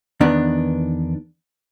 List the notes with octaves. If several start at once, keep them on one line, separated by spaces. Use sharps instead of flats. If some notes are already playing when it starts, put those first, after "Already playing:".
E2 D#3 B3 D4